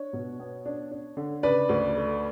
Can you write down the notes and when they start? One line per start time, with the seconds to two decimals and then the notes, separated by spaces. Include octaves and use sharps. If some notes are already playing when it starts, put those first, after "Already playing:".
Already playing: D4 C#5
0.13 B2
0.40 B3
0.66 D4
0.91 D4
1.17 D3
1.43 C#3 B4 D5
1.69 D2
1.96 A3